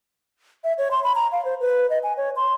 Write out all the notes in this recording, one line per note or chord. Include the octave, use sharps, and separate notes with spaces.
E5
C#5
C6
B5
A#5
F5
C5
B4
D#5
G#5
C#5
C6